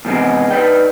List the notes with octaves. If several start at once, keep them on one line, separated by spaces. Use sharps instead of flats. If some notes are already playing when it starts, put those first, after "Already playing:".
E2 G#2 C3 D#3 G#3 B3
D#4 B4 D5 G5